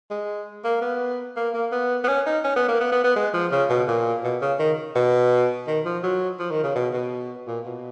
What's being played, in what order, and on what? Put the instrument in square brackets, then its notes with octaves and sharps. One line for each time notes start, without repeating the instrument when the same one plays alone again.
[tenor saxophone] G#3
A#3
B3
A#3
A#3
B3
B3
C#4
D#4
C#4
B3
A#3
B3
B3
B3
G#3
F3
C#3
B2
A#2
B2
C#3
D#3
B2
D#3
F3
F#3
F3
D#3
C#3
B2
B2
A#2
B2